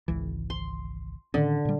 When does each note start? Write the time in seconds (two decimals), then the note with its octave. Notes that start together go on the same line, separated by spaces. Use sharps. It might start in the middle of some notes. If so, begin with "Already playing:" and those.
0.08 G#1 C#2 E3
0.50 C6
1.34 A2 D3 D#3 C#4
1.65 A#2 G3